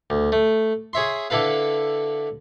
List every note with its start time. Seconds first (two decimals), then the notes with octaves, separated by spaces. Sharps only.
0.10 D2
0.32 A3
0.93 G#4 C#5 E5 C6
1.30 D3 E4 A4 B4 F5